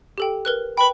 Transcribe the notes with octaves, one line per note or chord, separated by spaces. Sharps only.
G4 A4 G5
A#4 B4 F#6
B4 G5 B5